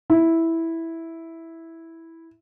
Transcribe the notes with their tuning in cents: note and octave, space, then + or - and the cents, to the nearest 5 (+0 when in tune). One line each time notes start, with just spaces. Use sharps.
E4 -5